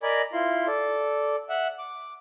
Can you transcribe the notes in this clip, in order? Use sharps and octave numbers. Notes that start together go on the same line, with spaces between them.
A#4 D5 D#5 G#5 B5
E4 F4 C6
A4 D5
E5 F#5
D6